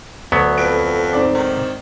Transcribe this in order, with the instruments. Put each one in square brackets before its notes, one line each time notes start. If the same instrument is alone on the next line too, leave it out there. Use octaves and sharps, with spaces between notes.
[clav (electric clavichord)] D2 F#3 B3
[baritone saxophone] F2 [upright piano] B4 D7
[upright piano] G#2 C4 D5
[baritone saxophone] D#3